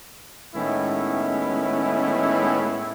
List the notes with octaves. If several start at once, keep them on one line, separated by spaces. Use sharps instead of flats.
A2 D#3 G#3 B3 C#4 E4